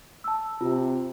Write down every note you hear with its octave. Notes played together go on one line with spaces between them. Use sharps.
A5 E6
C3 F4